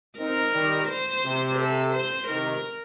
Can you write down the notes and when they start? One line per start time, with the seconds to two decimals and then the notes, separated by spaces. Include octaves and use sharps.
0.18 C4 D#4 A#4
0.53 D#3 G3
0.88 C5
1.23 C3
1.59 A4
1.93 C5
2.27 C3 D#3 A#4